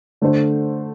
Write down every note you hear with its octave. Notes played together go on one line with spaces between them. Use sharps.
D3 A3 D4 A4 C5